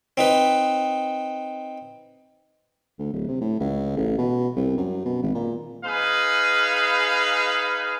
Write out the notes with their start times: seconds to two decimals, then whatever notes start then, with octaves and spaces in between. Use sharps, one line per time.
0.17 C4 D#4 B4
2.99 D2
3.13 D1
3.28 C3
3.41 A2
3.60 C#2
3.97 A1
4.18 B2
4.56 C2
4.77 F#2
5.05 B2
5.22 G#1
5.34 A#2
5.85 D#4 G#4 B4 F5